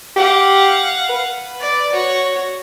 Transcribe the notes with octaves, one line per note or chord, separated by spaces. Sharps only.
G4 F5 F#5
B4
D5
F#4 C#5